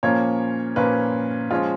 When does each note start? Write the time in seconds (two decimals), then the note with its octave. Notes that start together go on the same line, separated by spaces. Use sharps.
0.03 A#2 F3 A#3 C#4 C#5
0.76 A#2 F3 A#3 C#4 B4
1.51 F3 G#3 C#4 F4